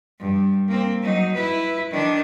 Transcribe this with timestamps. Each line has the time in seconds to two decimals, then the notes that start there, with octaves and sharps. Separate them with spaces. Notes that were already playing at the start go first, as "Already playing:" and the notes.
0.19 G2
0.68 A#3 C4
1.03 F#3 D#4
1.33 E4 B4
1.91 D#3 D4